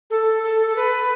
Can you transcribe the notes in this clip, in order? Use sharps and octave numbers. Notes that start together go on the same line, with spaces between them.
A4
A4
A4
B4